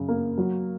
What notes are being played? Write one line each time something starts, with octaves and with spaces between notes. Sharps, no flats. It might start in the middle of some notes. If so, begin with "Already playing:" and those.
Already playing: F#2 C#3
A#3
F#3